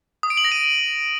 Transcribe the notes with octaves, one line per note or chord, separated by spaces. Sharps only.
D#6
D7
F#7
A#6
D#7